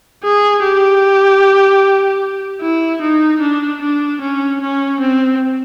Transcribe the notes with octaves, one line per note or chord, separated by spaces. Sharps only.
G#4
G4
E4
D#4
D4
D4
C#4
C#4
C4